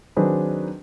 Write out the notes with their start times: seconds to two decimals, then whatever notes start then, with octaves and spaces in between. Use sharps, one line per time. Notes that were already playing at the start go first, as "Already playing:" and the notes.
0.16 D#3 F#3 C4 D4 G#4 B4